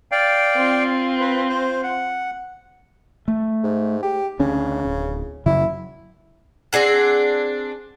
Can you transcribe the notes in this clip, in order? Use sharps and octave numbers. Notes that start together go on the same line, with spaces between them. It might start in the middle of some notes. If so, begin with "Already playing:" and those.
D5 F5 G5
C4 F4
B4
C5
F#5
A3
G#2
G4
D2 C#3 C#4 D4
D1
F#2 C#3 F#3 E4
C4 D4 G#4 F#5